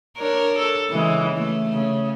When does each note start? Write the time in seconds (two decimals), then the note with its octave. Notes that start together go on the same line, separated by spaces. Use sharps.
0.17 D4 A#4 C#5
0.58 A4
0.91 C#3 E3 G#3
1.36 A3
1.73 C#3